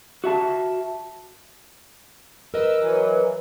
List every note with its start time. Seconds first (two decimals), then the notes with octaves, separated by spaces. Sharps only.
0.24 F#4 E5 A5
2.54 A#4 B4 D#5 E6
2.79 E3 F#3